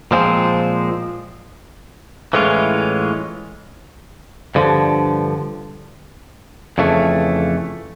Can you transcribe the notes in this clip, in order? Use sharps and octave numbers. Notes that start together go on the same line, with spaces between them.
A#2 F3 G#3 C4
A2 E3 G#3 C#4 F4
G2 D3 F3
F2 C#3 E3 A3